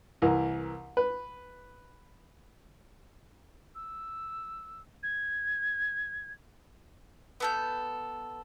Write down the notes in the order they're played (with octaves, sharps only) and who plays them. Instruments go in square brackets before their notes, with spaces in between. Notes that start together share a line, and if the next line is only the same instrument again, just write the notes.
[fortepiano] C2 E3 A#4
B4
[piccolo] E6
G#6
[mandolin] B3 A4 G6